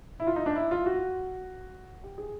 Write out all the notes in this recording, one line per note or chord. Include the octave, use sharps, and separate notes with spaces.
E4
F4
D#4
D4
E4
F4
F#4
G4
G#4